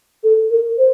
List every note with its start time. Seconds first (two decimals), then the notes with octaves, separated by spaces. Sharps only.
0.24 A4
0.51 A#4
0.78 C5